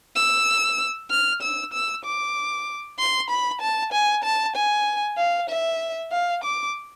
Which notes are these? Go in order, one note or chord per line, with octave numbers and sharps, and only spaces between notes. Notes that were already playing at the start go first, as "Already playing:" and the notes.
E6
F6
E6
E6
D6
C6
B5
A5
G#5
A5
G#5
F5
E5
F5
D6